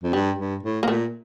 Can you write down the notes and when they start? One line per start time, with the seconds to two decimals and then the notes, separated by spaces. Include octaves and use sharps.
0.03 F2
0.13 G2 G3
0.38 G2
0.63 A2
0.83 A#3
0.87 A#2 A3